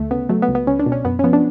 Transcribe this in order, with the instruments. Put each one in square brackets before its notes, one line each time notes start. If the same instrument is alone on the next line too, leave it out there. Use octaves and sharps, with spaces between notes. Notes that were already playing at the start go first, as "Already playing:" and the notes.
Already playing: [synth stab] D2 A3
C#3 B3
F#3 A3
B3
C#2
B3
C#2 C#4
D4
B2
C#4
F#2 B3
C#4
F3 B3
D4